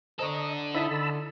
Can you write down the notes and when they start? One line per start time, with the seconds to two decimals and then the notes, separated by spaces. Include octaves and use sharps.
0.19 D4 A4 C5 D#5 A#5 C#6
0.74 D#4 E4 D#5 A5 B5 D#6 E6
0.90 D3